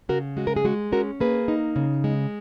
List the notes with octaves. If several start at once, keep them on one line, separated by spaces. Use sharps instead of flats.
C#3 F#4 A#4
G#3 F#4
A#4
G#4
G#3 F#4
C#4 F#4 A#4
A#3 G#4 B4
D#4
C#3
G#3